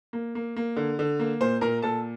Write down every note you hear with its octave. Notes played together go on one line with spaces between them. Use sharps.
A#3
A#3
A#3
D3
D3
A#3
A#2 C5 C6
A#2 A#4 A#5
A#2 A4 A5